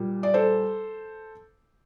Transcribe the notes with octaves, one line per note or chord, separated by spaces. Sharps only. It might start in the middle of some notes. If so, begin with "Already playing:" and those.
Already playing: A#2 G3
D5
A4 C5